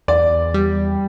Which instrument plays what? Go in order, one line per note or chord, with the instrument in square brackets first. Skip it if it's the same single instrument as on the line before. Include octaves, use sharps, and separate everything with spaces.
[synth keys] E2 [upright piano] D5
[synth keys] G3